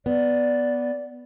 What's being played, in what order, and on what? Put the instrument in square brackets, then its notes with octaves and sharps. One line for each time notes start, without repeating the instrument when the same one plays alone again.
[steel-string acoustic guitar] B3 [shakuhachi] D5